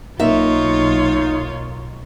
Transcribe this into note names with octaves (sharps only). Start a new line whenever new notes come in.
B1 A#3 D#4 F4 C#5 E5